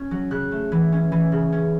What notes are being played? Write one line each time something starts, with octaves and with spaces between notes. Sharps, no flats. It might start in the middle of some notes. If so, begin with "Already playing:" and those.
Already playing: C#4
F#3
C#3 F#6
A3
E3
C#4
E3
C#3
C#4